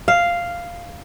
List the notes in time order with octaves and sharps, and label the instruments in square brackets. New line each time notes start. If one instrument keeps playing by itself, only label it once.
[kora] F5